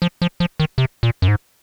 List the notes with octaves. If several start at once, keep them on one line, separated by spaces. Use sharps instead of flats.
F3
F3
F3
D#3
C3
A#2
F#2
G#2